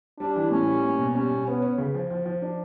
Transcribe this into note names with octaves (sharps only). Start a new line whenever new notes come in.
G3 D4
E3
A2 C#4
G3
A#3
B2
G3 C#4
B2
B3 C#4
C#4
C#3
F3
F3
F3
D4